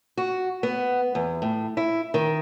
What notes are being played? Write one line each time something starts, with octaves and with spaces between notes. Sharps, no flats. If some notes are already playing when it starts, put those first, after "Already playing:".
F#4
B3
E2
A2
E4
D#3